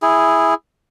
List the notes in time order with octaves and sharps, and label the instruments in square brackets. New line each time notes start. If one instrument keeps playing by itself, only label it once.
[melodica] E4 G#4